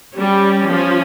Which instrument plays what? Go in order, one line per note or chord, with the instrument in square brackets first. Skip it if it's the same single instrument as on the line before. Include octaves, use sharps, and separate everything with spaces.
[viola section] G3 [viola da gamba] C#4
[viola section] F3